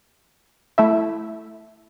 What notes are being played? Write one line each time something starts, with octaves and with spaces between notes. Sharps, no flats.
A3 E4 E5